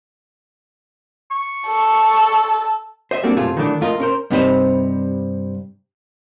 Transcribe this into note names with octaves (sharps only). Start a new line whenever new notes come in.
C#6
A4
C5 D#5 E5
G3 A#3 C4 D4 F#4 A4
B1 F#2 C3 A3 F4 G#4
D#3 E3 F#3 A3 D4
F2 A3 F4 A#4 C5 D#5
C#4 A#4 C5
G2 C3 D#4 B4 C5